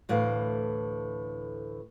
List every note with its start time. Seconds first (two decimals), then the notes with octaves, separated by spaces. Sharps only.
0.09 D2 A2 E3 F5